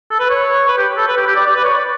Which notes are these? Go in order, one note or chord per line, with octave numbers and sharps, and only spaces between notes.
A4
B4
C#5
B4
G4
A4
B4
G4
G4
D5
D5
B4
C#5
D5